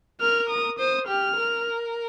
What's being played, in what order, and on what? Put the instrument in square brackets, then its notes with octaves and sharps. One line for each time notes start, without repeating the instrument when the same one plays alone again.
[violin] A#4 [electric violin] F6
[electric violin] D#6
[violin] C5 [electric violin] D#6
[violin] G4 [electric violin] F6
[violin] A#4